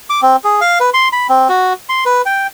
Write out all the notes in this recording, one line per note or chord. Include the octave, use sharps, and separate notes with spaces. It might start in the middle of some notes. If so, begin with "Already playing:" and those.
D6
C4
G#4
F5
B4
C6
B5
C4
F#4
C6
B4
G5